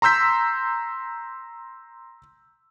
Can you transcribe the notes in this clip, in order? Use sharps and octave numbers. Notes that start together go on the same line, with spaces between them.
A#5 C6 E6 G6 B6